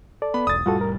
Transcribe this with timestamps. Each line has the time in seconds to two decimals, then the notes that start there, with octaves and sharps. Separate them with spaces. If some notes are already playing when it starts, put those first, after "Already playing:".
0.22 A4 D5
0.34 B3 B5
0.47 E1 B1 D#6 A6
0.66 F1 A2 G3 F4 F#4 A4
0.81 A#4